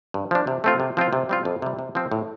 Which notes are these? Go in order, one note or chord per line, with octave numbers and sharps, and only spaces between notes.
G2
F3 D4
C3
A3 C4 F4
C3
F3 C4 F4
C3
G3 C4 F4
F2
C3 G3
C3
F3 C4 F4
A2